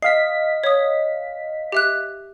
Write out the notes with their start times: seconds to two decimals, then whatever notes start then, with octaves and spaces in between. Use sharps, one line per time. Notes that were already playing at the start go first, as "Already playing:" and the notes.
0.02 D#5 F5 B6 C7
0.64 C#5 D#6
1.72 G4 E5 F#6